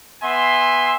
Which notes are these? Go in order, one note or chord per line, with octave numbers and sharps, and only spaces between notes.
B3 E5 G#5 C6